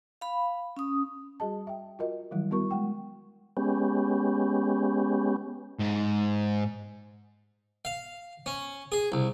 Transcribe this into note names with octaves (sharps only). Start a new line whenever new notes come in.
F5 B5
C#4 D#6
G3 F#4 G#4 D#5 A5
E5 G5
F4 F#4 A#4 D#5
D#3 E3 F#3 G3 E4
G3 B3 E4 F#4 A#4 C#6
F#3 G#3 F#5 G5 C#6
G#3 B3 C#4 G4
G#2
F5
C#4
G#4
C2